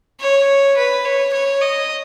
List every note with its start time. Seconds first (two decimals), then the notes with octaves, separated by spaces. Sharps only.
0.20 C#5
0.77 B4
1.06 C#5
1.33 C#5
1.62 D#5